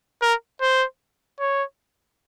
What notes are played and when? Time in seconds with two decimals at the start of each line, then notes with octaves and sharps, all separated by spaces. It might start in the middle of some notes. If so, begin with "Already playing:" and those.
0.22 A#4
0.61 C5
1.40 C#5